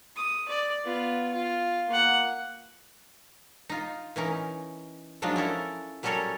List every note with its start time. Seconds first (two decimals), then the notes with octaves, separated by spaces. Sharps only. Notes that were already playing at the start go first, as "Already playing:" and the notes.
0.16 D#6
0.49 D5
0.84 B3 F4
1.33 F4
1.88 A#3 F#5
3.69 D#4 F4
4.16 E3 C#4 D#4 A#4
5.22 F3 F#3 G#3 D4 D#4 F4
5.36 C#4 E4 A4 A#4
6.03 F#3 G3 C#4 A4 A#4 C#5